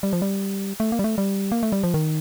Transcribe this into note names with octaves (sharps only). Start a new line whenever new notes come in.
G3
F3
G3
A3
A#3
G3
A3
G3
A#3
A3
G3
F3
D#3